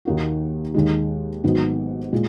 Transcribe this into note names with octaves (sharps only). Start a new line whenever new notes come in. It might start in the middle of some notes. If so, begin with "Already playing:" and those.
D#2 D#3 A#3 D#4 F#4
D#2 D#3 G#3
G#1 G#2 F#3 B3 D#4
A#2 G#3